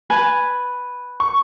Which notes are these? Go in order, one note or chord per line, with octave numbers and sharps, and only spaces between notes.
B4 G#5 A5
C#6